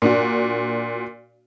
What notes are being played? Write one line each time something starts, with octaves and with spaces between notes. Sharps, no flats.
A#2 D4 F#4